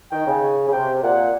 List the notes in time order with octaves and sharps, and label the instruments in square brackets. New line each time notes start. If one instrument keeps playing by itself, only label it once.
[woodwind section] D#3 [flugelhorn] G5
[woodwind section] C#3
[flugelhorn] G#5
[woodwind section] C#3
[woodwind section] C3 [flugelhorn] G5
[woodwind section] A#2 [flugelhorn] F#5